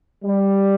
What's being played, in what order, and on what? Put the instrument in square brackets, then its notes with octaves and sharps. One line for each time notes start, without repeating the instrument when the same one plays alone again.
[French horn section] G3